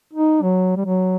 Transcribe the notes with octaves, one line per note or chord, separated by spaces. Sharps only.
D#4
F#3
G3
F#3